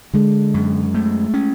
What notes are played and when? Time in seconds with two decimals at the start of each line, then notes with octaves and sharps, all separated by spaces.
0.14 D3 G#3
0.54 F#2
0.94 A3
1.34 C#4